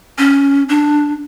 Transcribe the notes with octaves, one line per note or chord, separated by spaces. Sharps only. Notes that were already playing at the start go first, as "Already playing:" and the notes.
C#4
D4